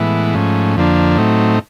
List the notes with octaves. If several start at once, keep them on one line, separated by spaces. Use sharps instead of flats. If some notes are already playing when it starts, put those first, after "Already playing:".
Already playing: A2 E3 G#3 B3 E4
G#2 F3 A3 C#4
F2 D3 F3 A#3 D4
A2 F#3 A3 C4 D#4